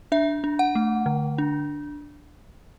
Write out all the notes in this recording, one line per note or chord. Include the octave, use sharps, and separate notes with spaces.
D4 E5
D4
F#5
A3
D3
D4